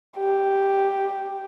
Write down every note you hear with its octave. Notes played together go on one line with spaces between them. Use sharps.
G4